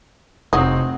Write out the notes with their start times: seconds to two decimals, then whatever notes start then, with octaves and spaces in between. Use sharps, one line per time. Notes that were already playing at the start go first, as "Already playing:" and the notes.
0.53 F1 F#3 C4 D#4 F#4 G#4 D#5